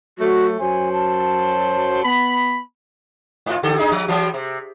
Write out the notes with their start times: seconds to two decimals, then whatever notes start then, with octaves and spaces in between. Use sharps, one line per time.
0.19 F#3 A3 F#4
0.60 F#2 F#3 C5 G#5
0.92 A5
2.03 B3 B5
3.46 G#2 F4
3.63 D3 G4 A4
3.78 D4 D#4 G#4
3.92 F3
4.08 E3 F#3 G3
4.34 C3